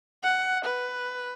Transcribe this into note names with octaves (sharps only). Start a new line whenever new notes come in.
F#5
B4